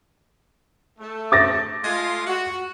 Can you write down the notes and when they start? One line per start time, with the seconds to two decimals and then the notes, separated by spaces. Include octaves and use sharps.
0.99 A3
1.32 D6 A6 A#6
1.83 G#3 A3 F4
2.27 F#4